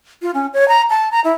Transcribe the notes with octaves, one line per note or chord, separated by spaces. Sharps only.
F4
C#4
C#5
A#5
A5
A#5
E4